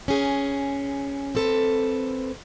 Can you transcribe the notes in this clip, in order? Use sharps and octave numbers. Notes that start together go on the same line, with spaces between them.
C#4 G#4
C4 A4 B4